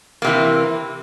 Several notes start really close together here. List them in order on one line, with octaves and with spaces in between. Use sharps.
A#3 C3 E3